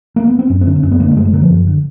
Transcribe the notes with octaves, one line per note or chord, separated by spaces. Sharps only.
A#3
B3
C4
F#2 C#4
C4
D3 C#4
C4
F#2 C#4
B3
D3 A#3
A3
F#2 G#3
A3
D3 A#3
F3
F#2
D3